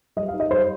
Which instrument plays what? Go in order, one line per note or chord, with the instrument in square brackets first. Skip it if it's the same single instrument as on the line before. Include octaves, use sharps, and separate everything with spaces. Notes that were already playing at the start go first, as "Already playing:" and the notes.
[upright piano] G3 D#5
F5
D#4
D#5
G3 C5